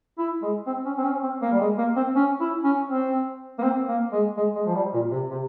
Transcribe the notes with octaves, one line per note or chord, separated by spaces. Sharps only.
E4
G#3
C4
C#4
C4
C#4
C4
A#3
G3
G#3
A#3
C4
C#4
E4
C#4
C4
A#3
C4
A#3
G#3
G#3
G#3
F3
G3
A#2
C3
C3